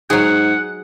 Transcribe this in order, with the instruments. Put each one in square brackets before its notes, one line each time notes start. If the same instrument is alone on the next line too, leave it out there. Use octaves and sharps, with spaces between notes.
[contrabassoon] G#2 [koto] F#3 G#4 [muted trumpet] F#5